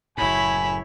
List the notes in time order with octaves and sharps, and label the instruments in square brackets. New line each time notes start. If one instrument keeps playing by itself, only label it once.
[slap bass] F#1 A2 [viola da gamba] E4 C#5 [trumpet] G#5 [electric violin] B5